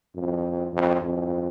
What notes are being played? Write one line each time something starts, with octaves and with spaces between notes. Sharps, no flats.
F2
F2
F2